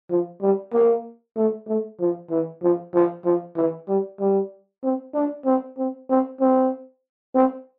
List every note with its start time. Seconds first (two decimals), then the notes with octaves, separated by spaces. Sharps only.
0.10 F3
0.41 G3
0.73 A#3
1.36 A3
1.68 A3
2.00 F3
2.30 E3
2.63 F3
2.94 F3
3.25 F3
3.56 E3
3.88 G3
4.20 G3
4.84 C4
5.14 D4
5.46 C4
5.78 C4
6.10 C4
6.41 C4
7.35 C4